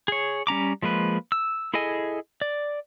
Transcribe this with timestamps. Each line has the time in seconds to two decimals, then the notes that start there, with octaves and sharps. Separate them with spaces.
0.08 G#4 C#5
0.47 G3 C#4 A#5 D6
0.82 F3 G#3 A#3 B4
1.32 E6
1.74 E4 G#4 A4 D#5 G#5
2.41 D5